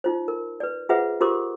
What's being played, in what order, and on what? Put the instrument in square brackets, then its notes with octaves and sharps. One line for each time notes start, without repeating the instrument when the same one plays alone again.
[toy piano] D#4 F4 C5
A#4
B4 D5
F4 G#4 B4 C5 E5 F#5
F4 G4 A#4 C5 C6 D6